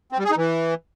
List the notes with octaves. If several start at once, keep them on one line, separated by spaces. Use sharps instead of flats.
C4
G3
G#4
D#4
E3